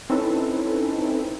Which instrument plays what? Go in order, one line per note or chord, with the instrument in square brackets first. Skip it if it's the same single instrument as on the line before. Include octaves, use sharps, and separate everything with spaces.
[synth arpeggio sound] C4 C#4 D#4 E4 A4 B4